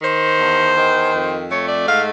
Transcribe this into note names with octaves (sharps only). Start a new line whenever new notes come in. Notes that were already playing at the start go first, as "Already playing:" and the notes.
D#3 C5
E2
D#3
F2
A3 C#5
D5
G#2 F5